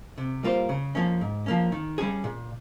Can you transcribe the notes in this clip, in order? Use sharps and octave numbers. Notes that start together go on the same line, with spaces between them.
C3
G3 A#3 F4 C5
C#3
F3 A#3 C#4
G#2
F3 A#3 C#4
D#3
G3 C#4 G#4
A#2